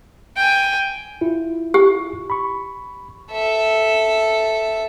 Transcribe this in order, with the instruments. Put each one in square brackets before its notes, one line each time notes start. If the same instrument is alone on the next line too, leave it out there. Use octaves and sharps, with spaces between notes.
[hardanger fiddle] G5 G#5
[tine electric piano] E4 F4
[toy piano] G4
[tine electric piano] B5 C#6
[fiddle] A4 E5